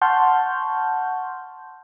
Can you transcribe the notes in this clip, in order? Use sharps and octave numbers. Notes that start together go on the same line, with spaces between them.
F#5 A5 C6 C#6 F6 G6